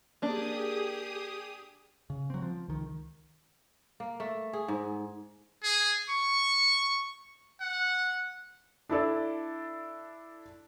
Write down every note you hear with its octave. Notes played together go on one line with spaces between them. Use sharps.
A#3 D4 G4 G#4 D#6
C#3
F#3 C4
F3
C#2 D#3
A#3
A3
G#4
G#2
G#4
C#6
F#5
D4 E4 A4 D5